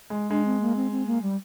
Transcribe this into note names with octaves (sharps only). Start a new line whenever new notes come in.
G#3
G#3 D4
C4
A#3
C4
C4
A#3
G3